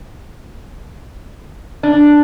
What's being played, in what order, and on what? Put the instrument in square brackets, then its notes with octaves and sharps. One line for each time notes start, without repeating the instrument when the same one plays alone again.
[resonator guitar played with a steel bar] D4